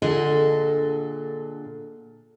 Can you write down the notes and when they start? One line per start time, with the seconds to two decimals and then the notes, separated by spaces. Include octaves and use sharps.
0.02 A#2 D3 D4 G#4 A4 D#5